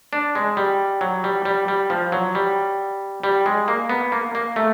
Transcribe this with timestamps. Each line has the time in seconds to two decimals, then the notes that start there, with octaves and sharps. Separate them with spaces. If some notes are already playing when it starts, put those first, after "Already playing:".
0.13 D4
0.35 G#3
0.57 G3
1.01 F#3
1.24 G3
1.45 G3
1.68 G3
1.90 F3
2.12 F#3
2.35 G3
3.23 G3
3.46 G#3
3.68 A#3
3.90 B3
4.12 A#3
4.35 A#3
4.56 A3